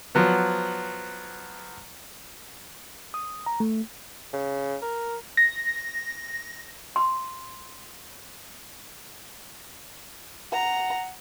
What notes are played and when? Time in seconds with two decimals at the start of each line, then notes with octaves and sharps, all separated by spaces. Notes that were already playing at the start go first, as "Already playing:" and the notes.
0.15 F3 F#3 B3
3.14 D#6
3.46 A#5
3.60 A3
4.33 C#3
4.82 A#4
5.37 A#6
6.96 C6
10.53 F#5 A#5